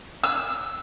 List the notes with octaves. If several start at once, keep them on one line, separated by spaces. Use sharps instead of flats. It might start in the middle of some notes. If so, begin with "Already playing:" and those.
E6